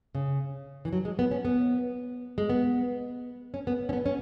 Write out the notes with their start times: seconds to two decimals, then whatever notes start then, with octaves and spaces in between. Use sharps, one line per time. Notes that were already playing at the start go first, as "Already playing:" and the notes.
0.15 C#3
0.85 E3
0.93 F#3
1.05 G#3
1.19 B3
1.31 C#4
1.45 B3
2.38 G#3
2.49 B3
3.54 C#4
3.67 B3
3.89 C#4
3.93 B3
4.06 C#4